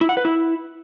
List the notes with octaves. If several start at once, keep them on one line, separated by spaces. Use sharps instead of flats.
E4
F#5
B4
E4